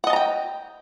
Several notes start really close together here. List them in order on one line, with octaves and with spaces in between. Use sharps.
F#5 D#5 A5 A#5 G5